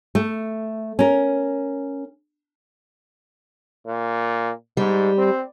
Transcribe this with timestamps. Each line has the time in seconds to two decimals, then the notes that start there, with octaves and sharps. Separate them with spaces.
0.15 A3
0.99 C#4 A#4
3.86 A#2
4.77 G#2 G3
5.18 C4